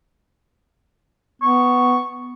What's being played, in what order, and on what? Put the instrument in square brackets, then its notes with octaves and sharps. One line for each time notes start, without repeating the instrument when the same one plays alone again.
[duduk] B3 [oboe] C#6